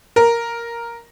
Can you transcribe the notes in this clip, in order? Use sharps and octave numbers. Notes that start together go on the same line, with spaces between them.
A#4